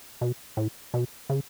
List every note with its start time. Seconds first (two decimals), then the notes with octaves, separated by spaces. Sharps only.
0.21 B2
0.57 A2
0.94 B2
1.30 C#3